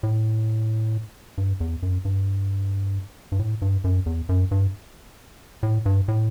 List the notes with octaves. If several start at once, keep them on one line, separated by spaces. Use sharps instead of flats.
A2
G2
E2
F#2
G2
G2
A2
G2
F#2
E2
F#2
G2
A2
G2
A2